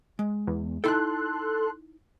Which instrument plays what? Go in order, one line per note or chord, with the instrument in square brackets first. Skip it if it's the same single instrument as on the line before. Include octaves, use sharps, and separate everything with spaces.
[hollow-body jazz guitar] G#3
[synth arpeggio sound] E2
[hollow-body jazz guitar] D#4 E4 G5 [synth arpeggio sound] A4 C6 F#6